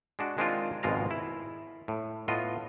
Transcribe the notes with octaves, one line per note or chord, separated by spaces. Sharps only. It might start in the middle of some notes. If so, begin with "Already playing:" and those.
G#3 D4 F#4
D#3 G#3 C4 D4 D#4 F4
G#1 F2 B2 G#3 F4 A#5
E4
A2
A2 B3 F4 D#5